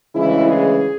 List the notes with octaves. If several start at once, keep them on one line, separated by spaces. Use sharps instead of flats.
D2 C#3 E3 G#3 E4
G#4